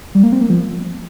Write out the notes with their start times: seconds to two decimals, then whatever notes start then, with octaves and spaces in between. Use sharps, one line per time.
0.15 G3
0.23 A#3
0.32 C4
0.41 A#3
0.50 F3